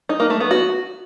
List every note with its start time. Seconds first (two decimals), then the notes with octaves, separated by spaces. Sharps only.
0.09 D#4
0.20 A#3
0.30 A3
0.40 B3
0.51 F#4